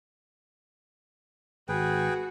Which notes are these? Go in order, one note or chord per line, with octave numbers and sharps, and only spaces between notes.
G#1 F#4 G#4 B4 G5